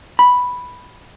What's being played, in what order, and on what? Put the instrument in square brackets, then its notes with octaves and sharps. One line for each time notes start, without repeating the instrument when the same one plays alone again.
[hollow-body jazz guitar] B5